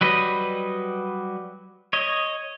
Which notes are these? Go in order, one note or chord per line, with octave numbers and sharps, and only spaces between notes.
F#3 G3 B4 D#5
C#5 D#5